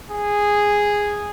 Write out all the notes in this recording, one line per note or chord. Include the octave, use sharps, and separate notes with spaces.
G#4